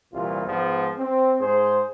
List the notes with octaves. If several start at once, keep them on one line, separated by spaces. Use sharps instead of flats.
C2 A#2 E3 F4
G#2 F3 G#3 B3
C4
G#2 G#4 C5